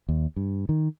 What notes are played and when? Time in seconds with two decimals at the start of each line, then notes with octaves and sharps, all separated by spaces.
0.09 D#2
0.36 G2
0.69 D#3